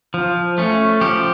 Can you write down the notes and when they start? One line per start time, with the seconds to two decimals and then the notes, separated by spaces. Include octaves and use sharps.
0.14 F3
0.58 A3 C#4
1.01 F3 G4